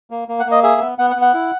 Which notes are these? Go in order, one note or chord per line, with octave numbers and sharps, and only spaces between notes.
A#3
A#3
F#5
A#3
D#5
G#4 E5
B3
B3 F#5
F#5
B3
F#5
E4